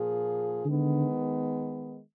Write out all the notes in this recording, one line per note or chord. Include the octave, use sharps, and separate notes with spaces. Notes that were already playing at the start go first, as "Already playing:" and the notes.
Already playing: A#2 F3 A#3 F4 G#4
D3 D#3 G#3 B3